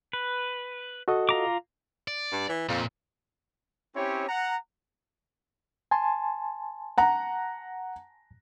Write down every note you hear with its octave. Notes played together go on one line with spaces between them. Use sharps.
B4
F#4 A4 D#5
F4 A#5 D6
D5
G2
E3
F2 A#2
C4 C#4 E4 G4 C#5
F#5 A#5
G#5 A5 C6
F#5 A#5